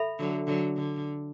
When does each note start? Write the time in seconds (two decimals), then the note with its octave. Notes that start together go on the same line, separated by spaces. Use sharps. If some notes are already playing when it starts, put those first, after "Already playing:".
Already playing: A4 E5 B5
0.19 D3 F#3
0.47 D3 F#3
0.77 D3